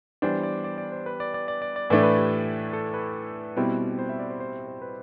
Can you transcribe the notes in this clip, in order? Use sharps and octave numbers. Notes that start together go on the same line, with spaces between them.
E3 G3 B3 D4 C5
D5
D5
D5
C5
B4
D5
D5
D5
D5
D5
A2 E3 A3 D4 D5
B4
G4
A4
B4
B2 G3 C4 E4
C5
E5
D5
C5
C5
C5
B4